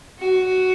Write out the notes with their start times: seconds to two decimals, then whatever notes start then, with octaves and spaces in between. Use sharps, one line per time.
0.20 F#4